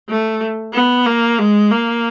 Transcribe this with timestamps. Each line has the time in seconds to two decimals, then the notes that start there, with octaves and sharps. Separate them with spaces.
0.09 A3
0.73 B3
1.06 A#3
1.38 G#3
1.71 A#3